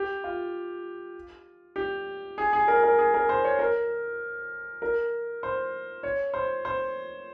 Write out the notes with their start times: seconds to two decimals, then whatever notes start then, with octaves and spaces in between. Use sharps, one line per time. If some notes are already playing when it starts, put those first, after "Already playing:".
Already playing: G4
0.24 F4
1.76 G4
2.38 G#4
2.53 G#4
2.68 A#4
2.83 A#4
2.98 G#4
3.14 A#4
3.29 C5
3.44 C#5
3.59 A#4
4.82 A#4
5.43 C5
6.03 C#5
6.34 C5
6.65 C5